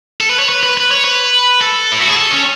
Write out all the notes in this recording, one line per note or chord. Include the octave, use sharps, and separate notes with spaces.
A4
B4
C#5
B4
B4
B4
C#5
B4
A4
E4
F#4
G#4
A4
C#4